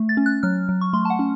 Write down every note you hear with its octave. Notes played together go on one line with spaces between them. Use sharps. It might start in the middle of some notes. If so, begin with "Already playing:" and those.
Already playing: A3
A6
C#4
F#6
F#3 F6
F#3
C#6
A3 C6
A5
F#5
C#4